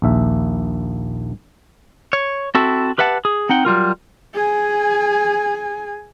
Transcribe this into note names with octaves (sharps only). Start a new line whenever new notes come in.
A#1 D#2 E5
C#5
C4 E4 F#4 A4 E5
G4 B4 E5 F#5 A5
G#4
C4 D#4 F#5 G5
F#3 G3 F4 A#4
G#4 G#5